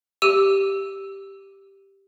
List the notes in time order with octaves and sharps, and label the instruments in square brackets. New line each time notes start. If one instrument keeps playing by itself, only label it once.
[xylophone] G4 E6 D#7